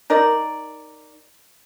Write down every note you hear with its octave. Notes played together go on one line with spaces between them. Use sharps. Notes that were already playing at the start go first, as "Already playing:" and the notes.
D#4 A#4 D5